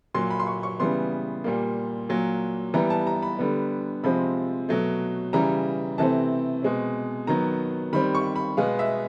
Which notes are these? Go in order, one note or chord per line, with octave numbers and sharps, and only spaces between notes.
A#2 F#3 A#3 C6
B5
C6
C#6
C#6
C#3 E3 G3 B3 C6
A#2 G3 A#3
A#2 F#3 A#3
E3 G3 B3 A#5
A5
A#5
B5
D3 G3 B3
C3 F3 G#3 C4 B5
B2 F#3 A3
C#3 E3 G3 A#5
C3 E3 A3 C4 A5
B2 G#3 C4
D#3 F#3 B3 A#5
D#3 G3 C4 B5
C#6
B5
B2 G#3 B3 F5
E5